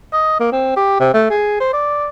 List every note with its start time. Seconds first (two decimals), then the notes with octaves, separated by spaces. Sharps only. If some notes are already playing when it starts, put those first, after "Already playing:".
0.13 D#5
0.40 A#3
0.52 C4
0.77 G4
1.00 C3
1.14 A3
1.30 G#4
1.60 C5
1.73 D5